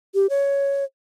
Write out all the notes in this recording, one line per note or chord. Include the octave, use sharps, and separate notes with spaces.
G4
C#5